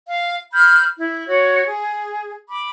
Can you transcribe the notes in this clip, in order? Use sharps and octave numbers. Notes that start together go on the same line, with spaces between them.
F5
B5 F6 G6
E4
F#4 C#5
G#4
B5 D6